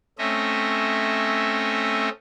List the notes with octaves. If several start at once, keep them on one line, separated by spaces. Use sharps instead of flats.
A3 C4 C#4 D#5 E5